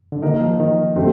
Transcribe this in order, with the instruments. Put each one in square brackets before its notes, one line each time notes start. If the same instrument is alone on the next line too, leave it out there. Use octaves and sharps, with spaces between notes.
[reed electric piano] D3
[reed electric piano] D#3 [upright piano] A#3 D#4 A#4 D#5
[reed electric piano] F3
D#3
[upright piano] D3 A3 C4 G4 C5